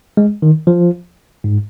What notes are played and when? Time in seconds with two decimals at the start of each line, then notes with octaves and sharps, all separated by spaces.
0.17 G#3
0.42 D#3
0.67 F3
1.44 G#2